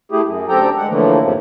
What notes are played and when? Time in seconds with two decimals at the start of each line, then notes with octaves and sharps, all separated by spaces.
0.12 A3 E4 G4 G#4
0.24 F#2
0.49 D2 C4 G4 A4 G5 A#5
0.78 G#3 F#5
0.89 A2 D3 E3 F3 A3 A#3
1.20 F2 G#2 C3 F3